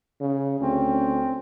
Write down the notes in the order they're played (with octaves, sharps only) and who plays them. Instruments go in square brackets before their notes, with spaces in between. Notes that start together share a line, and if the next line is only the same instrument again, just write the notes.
[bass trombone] C#3
[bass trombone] D2 [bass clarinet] C4 [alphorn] C#4